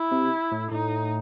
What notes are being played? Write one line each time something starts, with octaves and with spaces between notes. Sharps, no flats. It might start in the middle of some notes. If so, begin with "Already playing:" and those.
Already playing: E4
C3
A2
A2 D#4